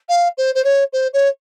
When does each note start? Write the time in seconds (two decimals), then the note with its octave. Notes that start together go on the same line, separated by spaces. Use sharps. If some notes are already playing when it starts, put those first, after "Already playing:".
0.09 F5
0.37 C5
0.55 C5
0.64 C#5
0.93 C5
1.13 C#5